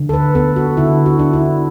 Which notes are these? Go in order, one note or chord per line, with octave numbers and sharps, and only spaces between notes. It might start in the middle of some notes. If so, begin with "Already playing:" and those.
Already playing: D3
A4
B4
B3 A4
F#4
D3 E4
F#4
D4
E4